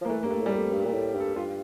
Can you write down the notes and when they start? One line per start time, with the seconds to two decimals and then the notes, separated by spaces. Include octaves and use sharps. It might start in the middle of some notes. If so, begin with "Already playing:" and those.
0.01 F3 A#3
0.09 E3 A3
0.23 G2 A#3
0.31 A3
0.41 A2 G3
0.52 A3
0.57 F2
0.72 G2
0.85 A#2
0.93 A2
1.15 G2
1.20 A4
1.36 G2 F4